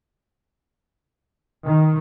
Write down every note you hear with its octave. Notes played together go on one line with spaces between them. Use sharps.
D#3